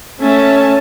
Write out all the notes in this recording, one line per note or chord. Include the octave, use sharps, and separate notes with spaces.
A3 C#4 E5 A5